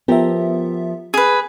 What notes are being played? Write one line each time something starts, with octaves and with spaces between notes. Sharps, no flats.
F3 B3 G4 A#4 E5
G#4 B4